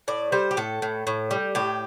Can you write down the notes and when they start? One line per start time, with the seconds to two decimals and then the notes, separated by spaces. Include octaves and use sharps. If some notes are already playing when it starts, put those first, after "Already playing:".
0.08 A2 D5
0.32 G3 C5
0.51 G4
0.57 A2 A4
0.82 A2
1.07 A2
1.31 G3
1.55 A2 G4